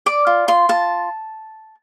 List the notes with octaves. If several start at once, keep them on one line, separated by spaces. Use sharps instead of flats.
D5 D6
F4
F4 C6
F4 A5